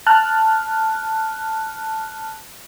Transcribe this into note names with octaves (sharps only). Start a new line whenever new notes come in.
A5 F6 F#6